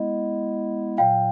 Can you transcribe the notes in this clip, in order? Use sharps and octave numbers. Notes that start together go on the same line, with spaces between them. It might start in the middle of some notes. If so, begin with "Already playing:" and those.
Already playing: G#3 B3 E4 D#5
A#2 F#3 F5 G5